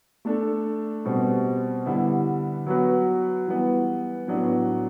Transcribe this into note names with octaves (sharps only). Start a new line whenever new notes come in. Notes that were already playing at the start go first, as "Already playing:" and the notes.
A3 D4 A4
B2 G3 C4
D3 G3 B3 E4
F#3 B3 F#4 B4
E3 G3 B3
A2 F#3 B3 D4